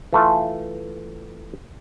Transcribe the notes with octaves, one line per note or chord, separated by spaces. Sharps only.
E3 A3 F4